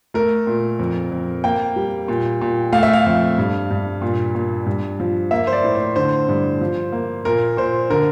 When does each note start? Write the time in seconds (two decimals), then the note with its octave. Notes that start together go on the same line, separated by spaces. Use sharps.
0.14 A3 A#4
0.47 A#2
0.79 F2
1.12 F2
1.44 A#3 G5
1.76 G3
2.08 A#2
2.41 A#2
2.72 A3 F5
2.83 E5
2.93 F5
3.06 F2
3.38 G2
3.71 G2
4.02 A#2
4.35 A#2
4.66 G2
5.00 F3
5.31 A#3 E5
5.47 C5
5.53 D5
5.64 A2
5.75 C5
5.96 D3 C5
6.28 G2
6.61 F3
6.92 A#3
7.25 A#2 A#4
7.57 A#2 C5
7.90 D3 A#4